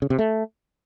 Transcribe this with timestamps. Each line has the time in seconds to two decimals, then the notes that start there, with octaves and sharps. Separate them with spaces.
0.02 C#3
0.10 C3
0.19 A3